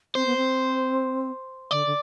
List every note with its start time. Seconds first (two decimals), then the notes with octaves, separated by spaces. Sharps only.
0.15 C4 C5
0.26 B3
0.37 C4
1.71 D3 D5
1.86 D3